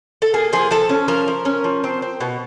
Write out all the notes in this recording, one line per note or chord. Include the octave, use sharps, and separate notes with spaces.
A4
A#3 G#4
F3 G#4
F3 A4
C#4
F3 A#4
F3
C#4
F3
C4
C4
B2